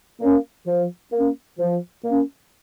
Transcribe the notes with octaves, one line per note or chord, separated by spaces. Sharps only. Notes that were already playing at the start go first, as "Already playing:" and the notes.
A#3 C#4
F3
A#3 C#4
F3
A#3 C#4